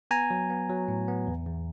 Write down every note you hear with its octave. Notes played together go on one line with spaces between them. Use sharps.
B3 G#5 A#5
F#3
B3
F#3
A2
B3
E2
E2